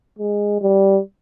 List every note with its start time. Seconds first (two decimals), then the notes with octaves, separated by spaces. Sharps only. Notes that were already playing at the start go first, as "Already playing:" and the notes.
0.19 G#3
0.62 G3